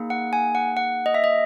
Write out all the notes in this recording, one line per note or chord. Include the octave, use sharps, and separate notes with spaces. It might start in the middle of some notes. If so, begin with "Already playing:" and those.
Already playing: A#3 D#4 G#4
F#5
G#5
F#5
F#5
D#5
E5
D#5